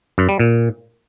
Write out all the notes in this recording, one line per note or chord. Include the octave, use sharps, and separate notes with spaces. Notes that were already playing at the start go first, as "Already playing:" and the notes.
F#2
G3
A#2